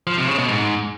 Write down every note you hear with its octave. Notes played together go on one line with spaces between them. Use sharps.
F3
C3
C#3
B2
G#2